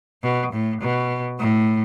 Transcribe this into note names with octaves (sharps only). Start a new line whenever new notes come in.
B2
A2
B2
A2